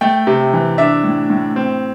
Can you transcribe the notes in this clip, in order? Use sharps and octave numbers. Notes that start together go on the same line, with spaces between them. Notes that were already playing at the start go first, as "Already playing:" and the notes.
A3 G5
C3
E3
D4 E5
A2
A2
C4